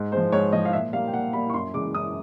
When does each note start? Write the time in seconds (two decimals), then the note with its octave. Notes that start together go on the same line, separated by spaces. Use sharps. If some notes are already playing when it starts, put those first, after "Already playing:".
Already playing: G#2
0.12 F3 G#3 C5
0.32 G#2 C#5
0.53 F3 G#3 D#5
0.65 F5
0.73 A#2 E5
0.93 G3 F5
0.96 A#3
1.07 G5
1.13 A#2 F#5
1.33 G3 A#3 B5
1.50 C#6
1.54 F#2 C6
1.74 C#3 E3 G#3 D6
1.95 F#2 D#6